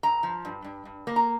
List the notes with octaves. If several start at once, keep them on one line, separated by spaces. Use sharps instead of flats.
G2 A#5
F3
G2
G2
G2
A#3
A#5